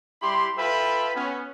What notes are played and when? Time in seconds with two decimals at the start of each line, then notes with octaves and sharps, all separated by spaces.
0.21 G3 E4 G4 B5 C6
0.57 F4 A4 B4 E5 G5 B5
1.15 B3 C#4